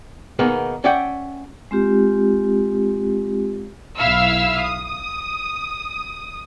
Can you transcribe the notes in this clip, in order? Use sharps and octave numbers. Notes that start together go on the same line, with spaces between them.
B2 D#3 A#3 B3 D#4 G#4
C#4 D5 E5 F#5 G5
G#3 C4 F4 G4
B1 E4 E5 F5 E6 F6
D#6